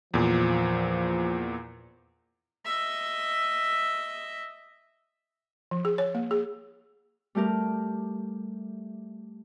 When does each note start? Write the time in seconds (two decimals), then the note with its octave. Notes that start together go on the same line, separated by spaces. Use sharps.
0.14 E2 A#2 F3
2.65 D#5 E5
5.71 F3
5.85 G#4
5.98 C#5
6.15 A#3
6.31 G#4
7.35 G3 A3 G4 A#4